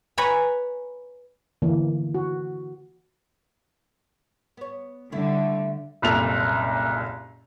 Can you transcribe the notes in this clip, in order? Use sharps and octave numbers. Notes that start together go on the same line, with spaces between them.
B4 C#5 G#5 A#5 B5
D3 E3 A#3
F#4
B3 C#5
D3 G3 A3 E4
F#1 C2 A#2 A4 F7